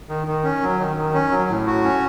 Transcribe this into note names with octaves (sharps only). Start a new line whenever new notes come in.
D#3
D#3
C#4
F#3
D#3
D#3
C#4
F#3
A2
F#4
C#4